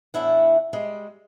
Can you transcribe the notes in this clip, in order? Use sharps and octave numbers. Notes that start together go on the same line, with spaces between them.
E2 A2 D3 D4 E4 F#5
G3 G#3